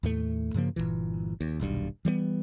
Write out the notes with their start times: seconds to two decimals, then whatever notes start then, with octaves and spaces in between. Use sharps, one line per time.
0.03 D#2 A2 A3
0.54 G2 C#3 F3 A#3
0.76 G1 C#2 A#2 E3
1.41 D#2
1.59 D#1 B1 G2
2.05 E3 G3 G#3 B3